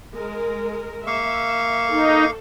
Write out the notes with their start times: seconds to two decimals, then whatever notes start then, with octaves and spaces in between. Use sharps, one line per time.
0.13 G#3 A#4
1.07 A#3 E5 F5 C#6
1.91 D#4 A4